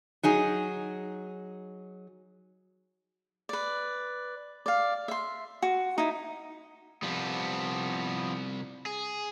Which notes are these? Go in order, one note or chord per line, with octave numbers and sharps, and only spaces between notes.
F#3 D#4 G#4
B4 D5
D5 F5
E5 C6
F#4
D#4 E4
C3 F3 G3 B3
G#4